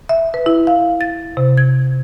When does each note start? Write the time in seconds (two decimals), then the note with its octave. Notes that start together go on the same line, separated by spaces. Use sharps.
0.09 E5
0.34 B4
0.46 E4
0.67 F5
1.01 A6
1.37 C3
1.57 G#6